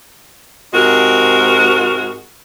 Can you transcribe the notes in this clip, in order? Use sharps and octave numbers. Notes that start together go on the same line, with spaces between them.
G#2 C3 G#3 F#4 A#4